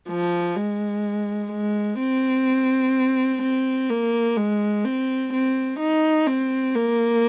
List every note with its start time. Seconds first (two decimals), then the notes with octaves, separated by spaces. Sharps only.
0.09 F3
0.56 G#3
1.52 G#3
1.99 C4
3.42 C4
3.90 A#3
4.37 G#3
4.84 C4
5.33 C4
5.80 D#4
6.27 C4
6.75 A#3